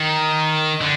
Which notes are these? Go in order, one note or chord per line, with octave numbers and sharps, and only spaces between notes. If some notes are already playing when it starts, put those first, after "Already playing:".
Already playing: D#3
D3